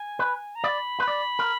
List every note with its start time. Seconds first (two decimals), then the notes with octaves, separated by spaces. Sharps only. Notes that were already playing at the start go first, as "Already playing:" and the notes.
Already playing: G#5
0.19 B4
0.55 A#5
0.64 D5 B5
1.00 B4
1.08 D5
1.39 A#4